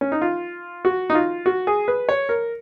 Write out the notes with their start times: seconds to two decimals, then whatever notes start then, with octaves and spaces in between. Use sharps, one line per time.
0.01 C#4
0.12 D#4
0.21 F4
0.85 F#4
1.10 D#4
1.15 F4
1.46 F#4
1.67 G#4
1.88 B4
2.09 C#5
2.29 A#4